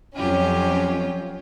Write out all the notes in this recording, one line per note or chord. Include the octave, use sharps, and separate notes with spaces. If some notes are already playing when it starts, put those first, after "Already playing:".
F2 F#3 C#4 F4 G4